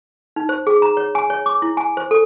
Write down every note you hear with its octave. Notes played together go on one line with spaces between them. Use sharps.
D#4
C5
G#4
A#5
C#5
G#5
C#5
D6
E4
G#5
C5
A4